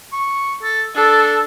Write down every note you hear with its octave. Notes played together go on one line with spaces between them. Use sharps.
C#6
A4
D4 A4